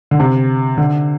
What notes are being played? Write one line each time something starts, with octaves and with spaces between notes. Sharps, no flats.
D3
C3
D3